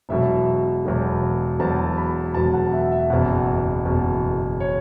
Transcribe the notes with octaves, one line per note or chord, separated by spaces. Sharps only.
E1 E2 B2 F#3 E5
E1 E2 B2 F#3
E1 E2 B2 F#3 A5
B5
E1 E2 B2 F#3 A5
F#5
E5
E5
F#1 E2 B2 F#5
F#1 E2 B2
C#5